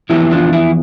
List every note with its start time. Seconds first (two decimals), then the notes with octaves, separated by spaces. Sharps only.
0.09 F2 E3 B3 E4 G4
0.31 D4 F4
0.53 E4